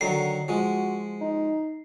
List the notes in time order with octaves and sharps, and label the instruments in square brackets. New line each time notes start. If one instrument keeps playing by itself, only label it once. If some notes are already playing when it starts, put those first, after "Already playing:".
[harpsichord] D3 D#3 F#3 [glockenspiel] C7
[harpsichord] F3 G#3 [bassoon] F#4
[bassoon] D#4